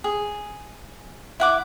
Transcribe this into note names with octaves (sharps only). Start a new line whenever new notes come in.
G#4
E4 F#5 D6